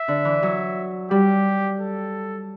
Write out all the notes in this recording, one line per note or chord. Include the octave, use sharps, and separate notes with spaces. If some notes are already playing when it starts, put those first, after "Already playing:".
Already playing: E5
D3
E3
F#3
G3 G4
A4